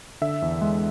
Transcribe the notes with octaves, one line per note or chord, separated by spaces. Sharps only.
D3 E5
E2
G#3